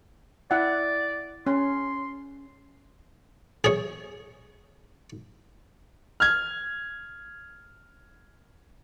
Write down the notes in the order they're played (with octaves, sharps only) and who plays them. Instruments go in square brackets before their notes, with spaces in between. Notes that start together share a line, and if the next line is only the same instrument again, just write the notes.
[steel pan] E4 F#5 [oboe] D5
[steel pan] C#4 [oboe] C6
[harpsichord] G#4 C#5
[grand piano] F6 G#6